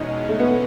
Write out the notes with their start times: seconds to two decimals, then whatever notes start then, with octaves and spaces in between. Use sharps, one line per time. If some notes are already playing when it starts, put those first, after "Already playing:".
Already playing: E2 B2 G#3 C#4 D#4
0.29 A3
0.40 B3